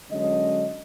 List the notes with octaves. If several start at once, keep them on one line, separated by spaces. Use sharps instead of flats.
D3 F#3 G#3 C#4 D#5